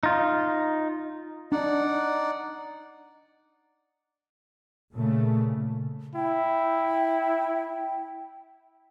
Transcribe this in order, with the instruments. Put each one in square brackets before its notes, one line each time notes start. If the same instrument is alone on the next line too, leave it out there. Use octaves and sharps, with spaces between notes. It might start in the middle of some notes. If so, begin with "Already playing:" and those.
[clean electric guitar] D#4 F4
[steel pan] D4 [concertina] D#4 D5 F#5
[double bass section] A#2 C#3 A3
[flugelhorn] E4 [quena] G5